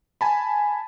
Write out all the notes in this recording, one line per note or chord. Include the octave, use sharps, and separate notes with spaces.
G#5 A5 B5